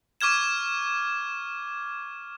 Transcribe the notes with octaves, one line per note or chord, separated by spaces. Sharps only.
C#6 D6 F6 G#6 E7